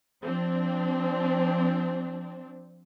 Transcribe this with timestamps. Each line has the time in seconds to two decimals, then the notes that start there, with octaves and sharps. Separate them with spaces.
0.23 F3 C4 D4